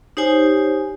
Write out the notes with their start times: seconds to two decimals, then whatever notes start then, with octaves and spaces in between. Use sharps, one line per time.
0.17 D#4 G4 C5 C#5 G#5